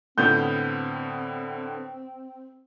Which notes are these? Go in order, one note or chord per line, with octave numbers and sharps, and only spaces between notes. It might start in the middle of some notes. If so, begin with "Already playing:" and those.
A2 D3 B3 C4 G6